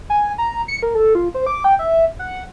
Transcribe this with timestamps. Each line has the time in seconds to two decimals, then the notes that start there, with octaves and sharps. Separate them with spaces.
0.10 G#5
0.38 A#5
0.68 C#7
0.83 A#4
0.95 A4
1.15 F4
1.34 C5
1.46 D6
1.64 G5
1.79 E5
2.19 F#5